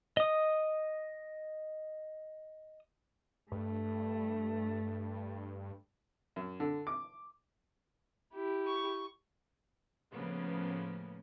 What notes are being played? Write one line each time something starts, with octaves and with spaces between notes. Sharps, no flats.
D#5 D#6
G2 A3
F#2
D3
D6
E4 G4
C#6
A2 C#3 F3 A#3 B3